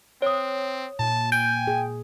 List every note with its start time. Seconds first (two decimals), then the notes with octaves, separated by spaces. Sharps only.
0.22 C4 C#5 D#6
0.99 A#2 A5
1.32 G5 G#5
1.67 G#4